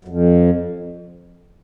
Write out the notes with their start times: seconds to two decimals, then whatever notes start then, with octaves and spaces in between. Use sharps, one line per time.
0.05 F#2
0.08 F2